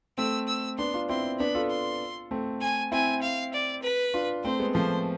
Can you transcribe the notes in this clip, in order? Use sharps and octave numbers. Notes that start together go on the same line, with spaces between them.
A3 C4 E6
E6
B3 D4 C6
D4 F4
C4 E4 C6
B3 D4 B5
F4 A4
C6
A3 C4
G#5
C4 E4 G#5
F5
D5
B4
D4 F4
A3 C4 C5
G#3 B3
F3 A3 C5